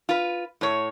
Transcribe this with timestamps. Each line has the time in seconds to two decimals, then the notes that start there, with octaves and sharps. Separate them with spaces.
0.09 F4 B4
0.61 A2 C#5